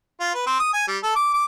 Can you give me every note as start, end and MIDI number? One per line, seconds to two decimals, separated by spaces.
0.20 0.34 65
0.35 0.45 71
0.47 0.56 60
0.59 0.73 87
0.73 0.84 80
0.88 0.97 55
1.03 1.16 69
1.16 1.29 86
1.33 1.44 86